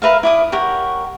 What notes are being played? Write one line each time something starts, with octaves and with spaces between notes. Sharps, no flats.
A#4 B4 E5 F5
E4 D5 D#6
G4 A#4 C#5 F#5